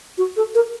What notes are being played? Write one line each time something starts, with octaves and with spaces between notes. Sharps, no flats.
F#4
A4
A#4